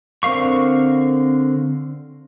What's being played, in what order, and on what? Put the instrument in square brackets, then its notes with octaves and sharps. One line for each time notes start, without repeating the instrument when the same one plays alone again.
[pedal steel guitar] D3 C4 A#4 F5 C#6